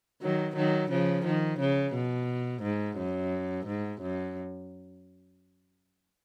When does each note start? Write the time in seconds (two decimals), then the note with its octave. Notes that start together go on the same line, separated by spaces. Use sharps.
0.21 D#3 F#3
0.57 D#3 F#3
0.91 C#3 F3
1.25 D#3
1.60 C#3
1.94 B2
2.63 G#2
2.98 F#2
3.66 G#2
4.02 F#2